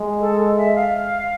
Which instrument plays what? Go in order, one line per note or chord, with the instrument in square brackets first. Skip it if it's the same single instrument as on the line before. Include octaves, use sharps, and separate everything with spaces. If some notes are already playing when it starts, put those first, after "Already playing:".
Already playing: [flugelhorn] G#3
[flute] A4
E5
F5